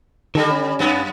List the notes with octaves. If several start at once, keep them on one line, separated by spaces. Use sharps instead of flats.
D3 D#3 G3 A4
C#4
F#2 B3